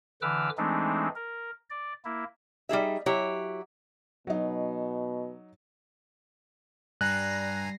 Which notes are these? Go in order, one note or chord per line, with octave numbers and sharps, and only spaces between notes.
D3 E3 B4 D6 E6 F6
E3 G#3 A3 C4 D4 D#4
A#4
D5
A#3 E4
G3 D#4 G#4 E5
F#3 E4 G4 C#5
B2 F#3 D#4
G2 G3 G#5 A#5 F#6 A#6 C7